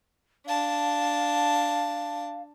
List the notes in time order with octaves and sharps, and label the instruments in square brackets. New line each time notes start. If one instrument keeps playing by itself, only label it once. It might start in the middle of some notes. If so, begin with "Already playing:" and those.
[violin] D4 A5 [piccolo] F5